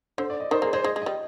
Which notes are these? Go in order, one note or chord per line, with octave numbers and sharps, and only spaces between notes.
D3 C5
D5
D#5
D#3 C5
A#3 G#4
G#3 C5
G#3 D#5
G#3
G3 D#5